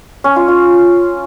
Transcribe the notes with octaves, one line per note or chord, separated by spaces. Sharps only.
C#4
F4
F4